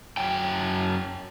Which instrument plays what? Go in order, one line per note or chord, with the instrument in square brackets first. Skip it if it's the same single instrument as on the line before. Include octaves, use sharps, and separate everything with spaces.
[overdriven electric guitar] F#2 G5